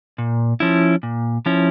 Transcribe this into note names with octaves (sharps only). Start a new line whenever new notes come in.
A#2
F3 C#4 E4
A#2
F3 C#4 E4